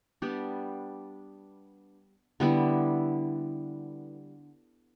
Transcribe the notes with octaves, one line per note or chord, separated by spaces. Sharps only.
G3 B3 D4 G4
D3 G3 B3 E4